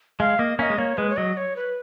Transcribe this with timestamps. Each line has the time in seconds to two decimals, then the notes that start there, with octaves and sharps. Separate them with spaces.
0.20 G#3 F5
0.39 A#3 D#5
0.59 A#3 C#4 D#5 F5
0.70 G#3
0.78 A#3 C#5
0.97 G#3 B4
1.10 C#5
1.17 F#3 D#5
1.37 C#5
1.56 B4